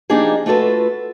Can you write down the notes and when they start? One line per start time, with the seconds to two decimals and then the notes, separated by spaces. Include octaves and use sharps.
0.10 F3 A#3 D4 D#4 G4 G#4
0.46 A3 F4 F#4 A4 B4